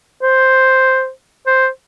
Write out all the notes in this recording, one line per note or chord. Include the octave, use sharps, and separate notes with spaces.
C5
C5